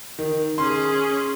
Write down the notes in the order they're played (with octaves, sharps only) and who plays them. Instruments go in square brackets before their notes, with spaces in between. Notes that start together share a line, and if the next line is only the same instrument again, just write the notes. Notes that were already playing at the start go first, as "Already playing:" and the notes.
[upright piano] D#3
[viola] C#4 G#4 [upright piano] C6